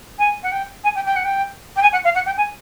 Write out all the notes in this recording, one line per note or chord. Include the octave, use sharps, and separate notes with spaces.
G#5
F#5
G5
G#5
G5
G5
F#5
G5
G5
G#5
F#5
F5
F#5
G5
G#5